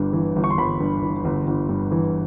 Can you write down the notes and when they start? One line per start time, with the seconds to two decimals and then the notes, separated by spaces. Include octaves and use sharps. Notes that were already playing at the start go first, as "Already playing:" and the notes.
Already playing: G1 G2
0.13 E3
0.36 G1
0.44 C#6
0.50 C6
0.58 G1 B5
0.80 G2
1.02 E3
1.25 G1
1.47 G1
1.69 G2
1.92 E3